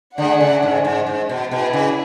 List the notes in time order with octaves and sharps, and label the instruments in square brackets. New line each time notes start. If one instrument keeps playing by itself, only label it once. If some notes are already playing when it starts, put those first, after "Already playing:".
[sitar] D3 [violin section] A3 D4 G#4 D5 F#5
[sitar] C#3
G#2
G#2
G#2
B2
[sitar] B2 [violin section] E4 G#4 B4
[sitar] C#3